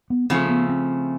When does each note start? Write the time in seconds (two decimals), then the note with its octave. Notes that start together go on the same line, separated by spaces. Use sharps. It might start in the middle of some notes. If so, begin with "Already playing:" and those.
0.10 B3
0.30 C#3 F3 A3 C4
0.49 B3
0.69 C4